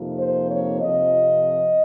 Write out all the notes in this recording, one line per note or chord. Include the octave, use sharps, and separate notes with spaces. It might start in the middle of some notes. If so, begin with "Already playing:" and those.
Already playing: F2 C3 F3 A#3 D#4
C5
C#5
F2 C3 F3 D#5